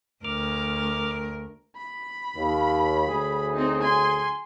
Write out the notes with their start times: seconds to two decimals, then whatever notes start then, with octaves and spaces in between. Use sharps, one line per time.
0.25 D2 A#4 D6 F6
1.76 B5
2.34 D#2
3.07 D2 F#3 G#4
3.54 C4 D#4
3.83 G#5 C6